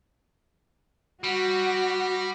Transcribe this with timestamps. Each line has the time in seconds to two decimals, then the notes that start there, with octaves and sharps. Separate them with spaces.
1.24 G3 F#4